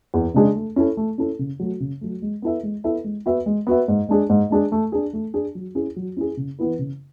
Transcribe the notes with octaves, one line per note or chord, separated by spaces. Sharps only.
E2
C#3 G#3 D4 G#4
A3
C#4 E4 A4
A3
C#4 E4 A4
C#3
F#3 A3
C#3
F#3 A3
G#3
B3 E4 A4 E5
G#3
B3 E4 A4 E5
G#3
B3 F#4 B4 E5
G#3
B3 F#4 B4 E5
G#2
G#3 D4 G#4
G#2
G#3 D4 G#4
A3
D4 G#4
A3
D4 G#4
F#3
C#4 E4 G#4
F#3
C#4 E4 G#4
C#3
E3 B3 E4 B4
C#3